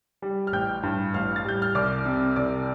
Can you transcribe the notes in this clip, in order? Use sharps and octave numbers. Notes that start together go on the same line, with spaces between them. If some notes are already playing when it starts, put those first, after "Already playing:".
G3
F6
A1 G5 G6
G2
A1 F5 F6
A6
G3 G6
F6
C2 D5 D6
C3
C2 D5 D6